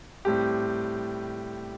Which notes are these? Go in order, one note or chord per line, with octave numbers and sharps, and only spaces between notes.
A2 G3 C4 G4